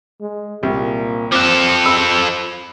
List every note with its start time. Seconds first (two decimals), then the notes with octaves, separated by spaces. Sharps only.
0.21 G#3
0.63 C2 A#2
1.32 F3 C4 A4 D6 F#6
1.86 B5 E6